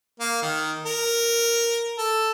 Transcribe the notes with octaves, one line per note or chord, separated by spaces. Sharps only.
A#3
D#3
A#4
A4